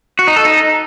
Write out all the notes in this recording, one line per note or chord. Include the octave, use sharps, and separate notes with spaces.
F#4
D#4
A4
D#4